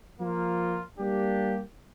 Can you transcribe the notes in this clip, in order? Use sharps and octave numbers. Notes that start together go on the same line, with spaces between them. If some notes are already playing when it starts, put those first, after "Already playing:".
F3 A#3 F4
G3 A#3 D4 G4